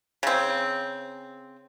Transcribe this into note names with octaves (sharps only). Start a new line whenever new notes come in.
C#3 C4